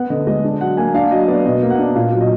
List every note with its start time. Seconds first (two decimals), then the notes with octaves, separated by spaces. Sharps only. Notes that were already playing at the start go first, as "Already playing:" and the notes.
Already playing: B3 F#5
0.10 D3 D#5
0.27 G#3 D#5
0.44 D4
0.61 F#3 F#5
0.77 A#3 G#5
0.94 D4 F5
1.11 F#3 D#5
1.28 B3 D5
1.45 B2 D#5
1.63 A#3
1.70 F#5
1.79 D4
1.95 A#2 F5
2.13 F#3
2.21 D#5